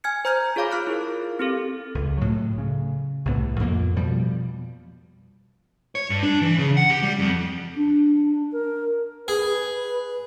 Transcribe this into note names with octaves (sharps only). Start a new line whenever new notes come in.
G#5 F6 G#6 C#7
C5 A#5 F6 G6 G#6
F4 G#4 C#5 F5 B5 D6
F4 F6 F#6 D7
E4 G#4 A#4
C4 G4 A4
C#2
A2 F#3
C#3
C2 A2 B3
F2 A#3
B2 F3 G3
C#5
G2
D4
E3
C#3
F#5
G4
G3
F2
D4
A#4
G#4 B4